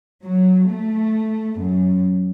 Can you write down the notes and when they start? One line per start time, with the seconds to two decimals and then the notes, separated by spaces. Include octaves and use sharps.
0.24 F#3
0.68 A3
1.59 F#2